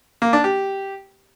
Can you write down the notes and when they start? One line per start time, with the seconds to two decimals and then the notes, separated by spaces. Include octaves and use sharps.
0.22 A#3
0.33 D4
0.44 G4